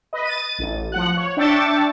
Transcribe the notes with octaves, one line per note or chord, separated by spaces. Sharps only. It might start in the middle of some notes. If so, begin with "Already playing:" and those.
B4 D#5
A6 D#7
A1
F3 F#5 F#6
C#5
D4 E5 G5 A5 C#6 A6